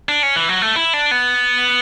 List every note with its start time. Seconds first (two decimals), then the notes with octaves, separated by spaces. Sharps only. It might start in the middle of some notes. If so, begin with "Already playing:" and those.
0.09 D4
0.23 C#4
0.36 E3
0.49 F#3
0.62 A3
0.76 E4
0.94 D4
1.11 B3